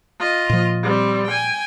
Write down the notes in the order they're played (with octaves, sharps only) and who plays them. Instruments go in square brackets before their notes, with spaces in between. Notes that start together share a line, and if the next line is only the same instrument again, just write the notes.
[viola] F4 D#5
[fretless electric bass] A#2 F3
[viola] G3 C4
G5 G#5